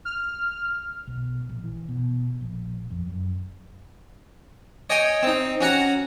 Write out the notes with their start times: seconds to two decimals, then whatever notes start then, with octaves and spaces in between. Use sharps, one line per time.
0.05 F6
1.07 B1
1.49 A#1
1.64 E3
1.88 B2
2.41 A#1
2.90 F2
3.07 F#2
4.90 C#5 D#5 G5 G#5
5.23 C4 D#4
5.61 C#4 F#4 F#5 A#5